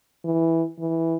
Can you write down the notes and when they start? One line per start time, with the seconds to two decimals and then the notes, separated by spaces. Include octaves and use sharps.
0.25 E3
0.79 E3